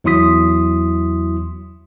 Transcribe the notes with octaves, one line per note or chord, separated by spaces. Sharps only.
E2 F#3 E4 C6 D#6 B6